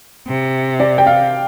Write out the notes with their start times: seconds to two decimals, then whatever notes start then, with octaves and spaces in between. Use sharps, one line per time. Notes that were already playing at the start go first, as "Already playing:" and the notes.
0.28 C3
0.80 D5
0.98 G5
1.06 F5